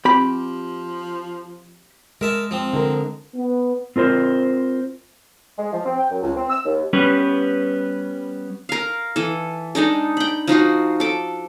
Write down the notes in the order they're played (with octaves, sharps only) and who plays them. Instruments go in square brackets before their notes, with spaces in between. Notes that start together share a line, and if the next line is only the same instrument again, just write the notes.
[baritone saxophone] F3 [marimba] C4 [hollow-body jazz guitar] G4 B5
[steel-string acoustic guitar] G#3 [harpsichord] A#4 E5 A5
[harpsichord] F3 C4
[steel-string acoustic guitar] D3 G#3 A#4
[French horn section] B3
[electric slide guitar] C4 F4 A#4 C5
[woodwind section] G#3
F3
C4
G5
F#2
C#2
C4
E6
D#2
[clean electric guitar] G3 B3 C#4 B4
[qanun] A#4 F5
E3 A4
G#3 D4 D#4 A4
G5 B5
F3 D#4 F4 F#4
A4 D6